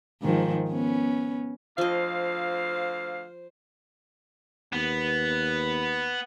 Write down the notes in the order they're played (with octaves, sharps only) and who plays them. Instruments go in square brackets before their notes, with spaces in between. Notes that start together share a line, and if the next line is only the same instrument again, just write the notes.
[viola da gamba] G#2 D#3 F3
B3 C#4
[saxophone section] D2 F5 [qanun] F3 D#5 [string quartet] C5
[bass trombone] D#2 [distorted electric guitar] B3